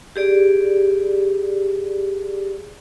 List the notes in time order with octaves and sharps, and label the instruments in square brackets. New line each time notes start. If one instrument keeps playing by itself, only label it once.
[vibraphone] G4 G#4 D5